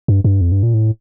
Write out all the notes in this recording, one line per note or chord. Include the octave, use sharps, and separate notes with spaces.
G2
G2
F2
G2
A#2
A2